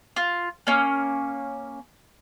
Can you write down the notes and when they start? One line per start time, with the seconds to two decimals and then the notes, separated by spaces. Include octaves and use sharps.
0.16 F4
0.67 A#3 C#4